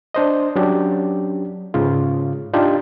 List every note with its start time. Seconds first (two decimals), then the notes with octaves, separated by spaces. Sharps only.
0.14 D4 C5 D#5
0.56 F#3 C#4 D4 G4
1.74 G#2 C#3 F4
2.54 D4 D#4 F4 G4